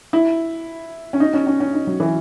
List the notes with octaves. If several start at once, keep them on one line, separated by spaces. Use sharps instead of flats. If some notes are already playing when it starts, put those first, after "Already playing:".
E4
C#4
D#4
C#4
C#4
C#4
D#4
F#3
E3